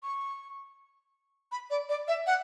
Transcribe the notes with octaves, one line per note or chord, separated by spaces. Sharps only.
C#6
B5
D5
D5
E5
F#5